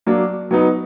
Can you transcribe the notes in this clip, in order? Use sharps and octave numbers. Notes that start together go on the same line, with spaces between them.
F#3 A#3 D4
F#3 B3 D#4